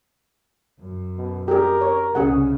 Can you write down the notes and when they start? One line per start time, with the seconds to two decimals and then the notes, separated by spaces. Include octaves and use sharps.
0.79 F#2
1.17 B2
1.48 G4 G#4 A#4
1.81 C#5
2.15 C2 C#3 C#4 G#4 F#5